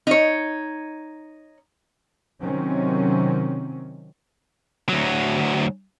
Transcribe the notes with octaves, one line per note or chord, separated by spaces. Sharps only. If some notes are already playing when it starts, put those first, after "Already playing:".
D#4 C#5
C3 D#3 F#3 C4 C#4
D2 F#3